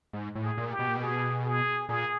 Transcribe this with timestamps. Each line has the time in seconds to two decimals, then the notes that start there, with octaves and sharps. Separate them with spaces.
0.13 G#2
0.35 A2
0.43 G#4
0.58 A#2
0.71 G4
0.79 B2
0.88 A#2
0.96 B2
1.01 G#4
1.45 G#4
1.89 A#2 G#4